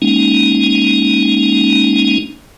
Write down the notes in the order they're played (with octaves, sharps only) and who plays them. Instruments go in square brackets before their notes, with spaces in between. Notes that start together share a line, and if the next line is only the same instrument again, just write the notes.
[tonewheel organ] G#3 A#3 C#4 D#4